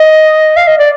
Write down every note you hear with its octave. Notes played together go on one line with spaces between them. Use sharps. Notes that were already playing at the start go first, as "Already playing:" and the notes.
Already playing: D#5
F5
D#5
D5